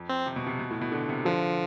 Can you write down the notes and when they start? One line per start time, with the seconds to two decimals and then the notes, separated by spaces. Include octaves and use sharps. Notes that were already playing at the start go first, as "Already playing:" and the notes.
Already playing: F2
0.09 C4
0.26 C3
0.36 B2
0.46 C3
0.59 B2
0.71 A2
0.81 B2
0.92 D3
1.09 C3
1.25 D3 F3